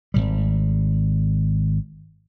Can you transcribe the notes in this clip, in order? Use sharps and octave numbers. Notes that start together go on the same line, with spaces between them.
G#1 D#2 G3